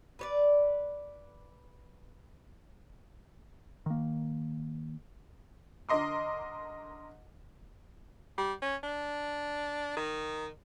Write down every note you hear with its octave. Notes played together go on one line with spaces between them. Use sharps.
B4 C#5 D5
D#3 A#3
D3 A#4 D#5 C6 D6
G3
C#4
D4
D#3